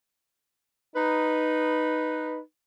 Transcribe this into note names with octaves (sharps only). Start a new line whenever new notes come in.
D#4 B4